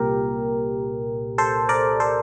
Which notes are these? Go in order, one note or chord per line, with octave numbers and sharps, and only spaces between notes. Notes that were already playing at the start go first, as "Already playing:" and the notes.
Already playing: C2 A#2 G4 A#4
A4 C5
A#4 D5
A4 C5